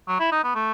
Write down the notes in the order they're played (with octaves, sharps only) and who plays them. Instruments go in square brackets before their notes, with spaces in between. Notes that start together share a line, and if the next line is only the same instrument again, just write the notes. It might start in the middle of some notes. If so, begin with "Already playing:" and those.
[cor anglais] F#3
E4
D#4
B3
A3